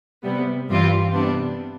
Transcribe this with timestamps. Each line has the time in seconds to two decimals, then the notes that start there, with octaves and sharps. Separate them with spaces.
0.24 C3 G3 B3
0.69 G2 E3 G3 C4 F4
1.13 C3 G3 B3 D4